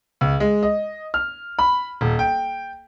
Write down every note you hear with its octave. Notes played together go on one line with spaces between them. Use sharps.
C#2
G#3
D#5
F6
B5
D#1
G5